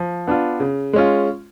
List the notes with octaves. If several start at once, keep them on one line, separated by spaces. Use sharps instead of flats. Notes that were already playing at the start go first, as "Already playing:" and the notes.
Already playing: F3
B3 D4 F4
C#3
G#3 C#4 F4